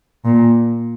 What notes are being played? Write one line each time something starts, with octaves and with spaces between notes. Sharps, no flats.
A#2